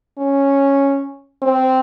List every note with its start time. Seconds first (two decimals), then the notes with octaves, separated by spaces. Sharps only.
0.18 C#4
1.42 C4